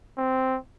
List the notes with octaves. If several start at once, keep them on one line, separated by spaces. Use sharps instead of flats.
C4